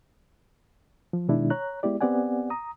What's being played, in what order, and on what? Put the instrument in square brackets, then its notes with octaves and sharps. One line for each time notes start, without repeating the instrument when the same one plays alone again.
[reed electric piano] F3
B2 D#3 G#3 D4 E4
C#5 A#5 F#6
G#3 B3 E4 G4 D5
B3 C4 G4 D5 F#5 G#5
A#5 D#6